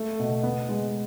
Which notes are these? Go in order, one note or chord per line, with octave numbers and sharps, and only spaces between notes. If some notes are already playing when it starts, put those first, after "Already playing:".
Already playing: A3
B2
B3
G#3